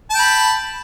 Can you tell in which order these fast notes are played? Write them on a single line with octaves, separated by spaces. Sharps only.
A5 G5 B5